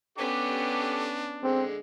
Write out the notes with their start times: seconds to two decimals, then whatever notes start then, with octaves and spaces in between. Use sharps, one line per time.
0.18 B3 C#4 D4 G4 A4 D6
1.43 D3 G#3 C4